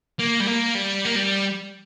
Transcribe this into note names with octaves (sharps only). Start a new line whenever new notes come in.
A#3
G3
A#3
G3
A#3
G3